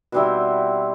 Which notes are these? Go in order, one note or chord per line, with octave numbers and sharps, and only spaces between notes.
B2 G3 C4 E4